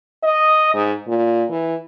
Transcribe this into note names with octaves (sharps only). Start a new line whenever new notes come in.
D#5
G#2
A#2
E3